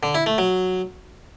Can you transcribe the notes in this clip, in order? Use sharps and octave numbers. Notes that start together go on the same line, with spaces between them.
D3
E4
A3
F#3